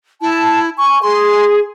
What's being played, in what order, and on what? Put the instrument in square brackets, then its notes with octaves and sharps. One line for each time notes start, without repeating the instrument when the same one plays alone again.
[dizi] E4 [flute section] A5
[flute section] G#5 [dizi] C#6
[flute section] G#4 [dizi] C6